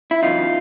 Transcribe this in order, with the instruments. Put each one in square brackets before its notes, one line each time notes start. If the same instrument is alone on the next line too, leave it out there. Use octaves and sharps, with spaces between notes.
[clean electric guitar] E4
E2 C#3 F#3 D#4 F4